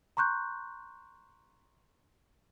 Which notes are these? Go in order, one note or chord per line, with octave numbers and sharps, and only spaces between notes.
A#5 C6 C#6 F#6 G6